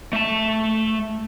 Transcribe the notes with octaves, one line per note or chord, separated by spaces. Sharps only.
A3 A5